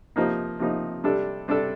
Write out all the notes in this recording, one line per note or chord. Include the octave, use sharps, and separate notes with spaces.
C3 F3 A#3 D#4
C3 F3 A#3 D#4
C3 G3 D4 A4
C3 G3 D4 A4